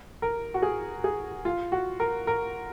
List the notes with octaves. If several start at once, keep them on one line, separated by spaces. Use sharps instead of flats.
A#4
F#4
G#4
G#4
F4
F#4
A#4
A#4